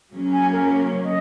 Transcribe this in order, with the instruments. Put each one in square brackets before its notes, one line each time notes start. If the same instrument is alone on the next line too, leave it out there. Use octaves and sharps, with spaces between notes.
[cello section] C#3 F#3 A#3 C#4
[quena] G#5
A#4
C#5
D#5